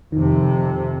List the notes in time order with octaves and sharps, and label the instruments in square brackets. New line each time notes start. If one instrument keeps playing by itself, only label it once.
[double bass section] F2 C3 [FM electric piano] D#3